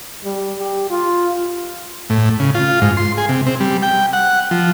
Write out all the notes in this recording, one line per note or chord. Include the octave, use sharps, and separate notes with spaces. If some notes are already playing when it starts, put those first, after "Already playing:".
G3
G4
F4
A2
C#3
F4
G#2
C6
G#4
C3
C4
G3
G5
F#5
F3